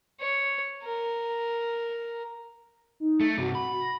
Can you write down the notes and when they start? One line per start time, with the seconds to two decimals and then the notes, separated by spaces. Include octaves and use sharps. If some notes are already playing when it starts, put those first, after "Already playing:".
0.21 C#5
0.84 A#4
3.00 D#4
3.20 A3
3.38 G2 C3 F#4
3.55 B5
3.80 A#6